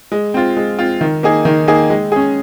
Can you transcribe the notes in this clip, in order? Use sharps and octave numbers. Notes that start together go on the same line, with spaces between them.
G#3
C4 F4
G#3
C4 F4
D#3
A#3 D#4 G#4
D#3
A#3 D#4 G#4
G#3
C#4 G#4